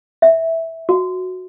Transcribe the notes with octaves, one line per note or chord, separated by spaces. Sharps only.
E5
F#4